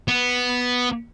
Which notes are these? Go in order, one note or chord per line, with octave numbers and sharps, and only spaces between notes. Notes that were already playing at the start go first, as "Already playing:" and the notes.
B3